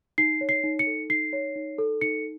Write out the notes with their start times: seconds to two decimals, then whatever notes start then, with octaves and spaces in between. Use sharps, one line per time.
0.18 D#4 C7
0.41 C#5
0.49 C7
0.64 D#4
0.79 C#7
0.87 A4
1.10 D#4 C7
1.33 C#5
1.56 D#4
1.78 A4
2.01 D#4 C#7